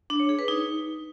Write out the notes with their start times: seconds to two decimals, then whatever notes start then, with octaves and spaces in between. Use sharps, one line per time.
0.10 D4
0.20 C#5
0.29 G#4
0.39 B4
0.48 D#4